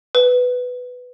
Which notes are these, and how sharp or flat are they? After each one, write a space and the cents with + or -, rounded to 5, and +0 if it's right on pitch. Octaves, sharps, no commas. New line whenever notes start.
B4 +10